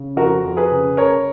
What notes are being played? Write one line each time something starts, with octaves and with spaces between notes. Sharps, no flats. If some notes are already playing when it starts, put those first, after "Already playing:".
Already playing: C#3
F2 F#4 A#4
F2
G#4 B4
C#3
F#1 A#4 C#5